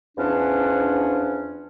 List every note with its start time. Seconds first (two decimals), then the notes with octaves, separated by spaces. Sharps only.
0.18 E2 F3 C#4 D4